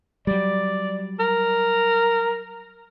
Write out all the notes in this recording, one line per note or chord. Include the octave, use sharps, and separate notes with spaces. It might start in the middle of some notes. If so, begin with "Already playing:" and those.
F#3 G3 D5
A#4